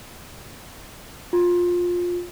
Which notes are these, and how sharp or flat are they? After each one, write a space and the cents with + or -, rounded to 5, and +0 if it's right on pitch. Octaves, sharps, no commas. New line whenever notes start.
F4 +15